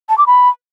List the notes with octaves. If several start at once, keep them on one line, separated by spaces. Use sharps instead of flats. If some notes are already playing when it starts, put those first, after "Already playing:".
A5
D6
B5